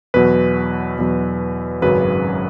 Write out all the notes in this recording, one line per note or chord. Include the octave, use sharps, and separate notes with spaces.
E2 B2 F#3 B4
E2 B2 F#3
G#1 F#2 C#3 F#3 B4